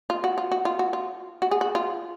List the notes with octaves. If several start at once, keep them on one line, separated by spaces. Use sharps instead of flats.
F4
F#4
F4
F#4
F4
F#4
F4
F#4
G#4
F#4
F4